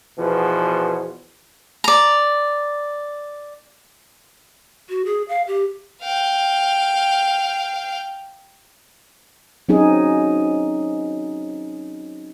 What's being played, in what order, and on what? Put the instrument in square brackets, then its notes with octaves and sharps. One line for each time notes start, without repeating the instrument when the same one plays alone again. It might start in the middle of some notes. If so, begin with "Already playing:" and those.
[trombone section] E2 B2 F3
[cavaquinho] D5 A#5
[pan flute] F#4
G#4
F5
G4
[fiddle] F5 G5
[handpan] F#3 C4 C#4 D#4 G#4